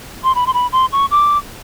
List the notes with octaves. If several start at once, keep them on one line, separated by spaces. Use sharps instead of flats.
C6
B5
C6
B5
C6
C#6
D6